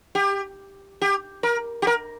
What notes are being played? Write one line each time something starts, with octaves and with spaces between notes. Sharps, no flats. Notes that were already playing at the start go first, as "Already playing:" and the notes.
G4
G4
A#4
G4
A#4